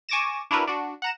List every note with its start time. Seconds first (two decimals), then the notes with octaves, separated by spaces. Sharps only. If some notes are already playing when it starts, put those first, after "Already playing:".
0.09 G#5 C#6 D6 A6 A#6 E7
0.51 D4 E4 F#4 A#4 B4
0.67 D4 F#4
1.02 F#5 A#5 E7